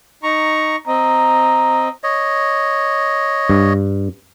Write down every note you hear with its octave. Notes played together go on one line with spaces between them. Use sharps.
D#4 A#5 C#6
C4 D#5 A#5
C#5 D#5
G2